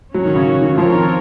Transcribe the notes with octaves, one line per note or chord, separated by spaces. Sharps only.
F#3 C#4 F#4 C#5
D#3
C#3
D#3
D#3
F3 C4 F4 A#4 C#5
D#3